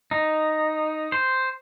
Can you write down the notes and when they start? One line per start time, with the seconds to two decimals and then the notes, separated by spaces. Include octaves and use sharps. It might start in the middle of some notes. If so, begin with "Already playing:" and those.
0.11 D#4
1.12 C5